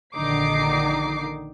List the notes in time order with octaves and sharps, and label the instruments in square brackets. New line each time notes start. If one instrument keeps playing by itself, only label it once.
[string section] A#1 D3 D#3 D#4 D6 C7